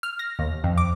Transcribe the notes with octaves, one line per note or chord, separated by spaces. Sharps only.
F6
A#6
D#2
F2
D6